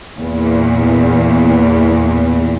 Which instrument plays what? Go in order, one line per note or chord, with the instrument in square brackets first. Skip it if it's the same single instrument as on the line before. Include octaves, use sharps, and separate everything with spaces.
[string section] E2 A#2